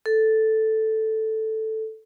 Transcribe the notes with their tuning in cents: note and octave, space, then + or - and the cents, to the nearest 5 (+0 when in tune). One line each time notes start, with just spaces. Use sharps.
A4 +0